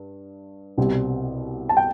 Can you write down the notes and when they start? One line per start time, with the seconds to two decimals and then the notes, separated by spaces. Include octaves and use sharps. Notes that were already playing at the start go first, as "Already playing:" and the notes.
Already playing: G2
0.78 C2 B2 G3 C4
1.69 A5
1.77 G5